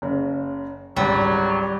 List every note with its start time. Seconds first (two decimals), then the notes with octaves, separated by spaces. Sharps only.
0.02 F#1 C#3
0.96 G#1 C#2 F#3 G3